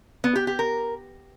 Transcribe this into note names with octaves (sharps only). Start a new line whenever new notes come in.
B3
G4
G4
A#4